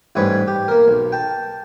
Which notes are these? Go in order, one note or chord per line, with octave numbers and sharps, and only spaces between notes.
A1 G#2 G3 G#3 B4 C#5
G4
A#3 A#4
B1
G5 A5